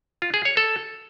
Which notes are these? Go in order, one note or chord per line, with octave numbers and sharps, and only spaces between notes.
F4
G#4
C#5
A4